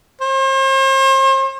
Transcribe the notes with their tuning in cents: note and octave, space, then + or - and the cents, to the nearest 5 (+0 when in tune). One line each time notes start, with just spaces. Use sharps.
C5 +40